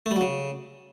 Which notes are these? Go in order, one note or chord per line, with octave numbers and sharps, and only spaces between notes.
A3
G3
F#3
C#3